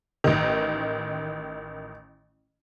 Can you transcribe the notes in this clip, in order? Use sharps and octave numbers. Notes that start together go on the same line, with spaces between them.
A1 D#3